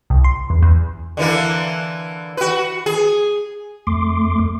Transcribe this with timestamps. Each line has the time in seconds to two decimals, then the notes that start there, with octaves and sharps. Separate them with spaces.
0.10 C2
0.24 C6
0.50 E2
0.62 E2
1.17 D3 E3 A#3
2.37 F#4 B4
2.86 G#4
3.87 F2 A3 C6 D6